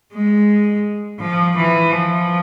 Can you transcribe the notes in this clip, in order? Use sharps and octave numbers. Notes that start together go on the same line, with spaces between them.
G#3
F3
E3
F3